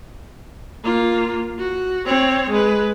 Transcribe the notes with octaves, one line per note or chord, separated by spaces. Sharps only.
A#3 F4
F#4
C4 C#5
G#3 B4